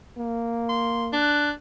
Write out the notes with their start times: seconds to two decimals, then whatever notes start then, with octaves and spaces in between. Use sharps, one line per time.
0.17 A#3
0.69 C6
1.13 D4 F#6